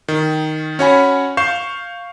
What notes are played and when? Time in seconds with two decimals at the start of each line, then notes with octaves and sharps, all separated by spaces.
0.08 D#3
0.79 C#4 F#4 C#5 F#5 G#5 B5
1.37 F5 C#6 G6 C7 E7